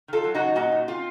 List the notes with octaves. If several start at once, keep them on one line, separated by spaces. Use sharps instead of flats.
D#3 F4 A4
F#3
D#4 F#4
D#3
A#2 D#4 F#4
A#2
C4 F4